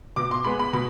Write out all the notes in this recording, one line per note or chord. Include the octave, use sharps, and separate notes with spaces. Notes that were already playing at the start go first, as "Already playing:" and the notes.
B2 D6
C6
G#3 B3 B5
B5
B2 B5